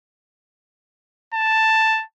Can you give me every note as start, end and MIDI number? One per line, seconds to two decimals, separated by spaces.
1.34 2.03 81